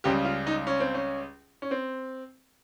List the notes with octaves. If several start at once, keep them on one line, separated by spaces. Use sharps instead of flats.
C#2 C#3 G3 G4
F4
D#4
C#4
C4
C#4
C#4
C4